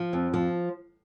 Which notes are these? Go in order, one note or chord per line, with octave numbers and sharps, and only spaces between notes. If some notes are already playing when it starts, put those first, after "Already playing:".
Already playing: F3
F2
F3